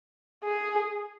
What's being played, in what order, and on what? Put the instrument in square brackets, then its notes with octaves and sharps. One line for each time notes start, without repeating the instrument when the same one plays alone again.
[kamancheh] G#4